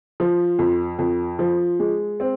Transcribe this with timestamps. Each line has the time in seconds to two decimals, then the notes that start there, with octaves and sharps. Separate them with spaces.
0.20 F3
0.59 F2
0.99 F2
1.39 F3
1.80 G#3
2.20 C4